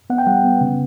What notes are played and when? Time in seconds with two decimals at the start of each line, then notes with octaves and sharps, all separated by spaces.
0.10 B3 F#5
0.18 G5
0.27 G3 F#5
0.44 B3
0.61 C#3